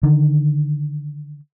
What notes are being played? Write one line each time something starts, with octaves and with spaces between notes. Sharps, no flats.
D3 D#3